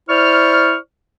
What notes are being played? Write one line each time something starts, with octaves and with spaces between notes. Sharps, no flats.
E4 C5 D5 C#6 F6